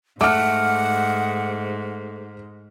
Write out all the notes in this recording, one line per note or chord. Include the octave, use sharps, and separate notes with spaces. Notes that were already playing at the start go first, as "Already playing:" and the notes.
G#2 A3 F#5 D6 F6